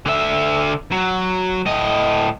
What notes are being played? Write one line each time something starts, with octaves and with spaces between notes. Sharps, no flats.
D3 E5
F#3
A2 D#5